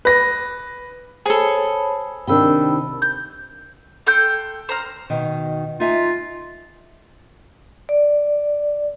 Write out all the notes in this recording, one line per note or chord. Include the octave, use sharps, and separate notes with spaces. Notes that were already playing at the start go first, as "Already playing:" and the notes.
B4 A#6
G#4 A4 C5 C#5 B5
C3 D#3 D4 G5 B5 E6
G6
A4 G5 C6 G6
C5 A#5 F6
B2 D#3
D#4 F4 E5 G#5
D5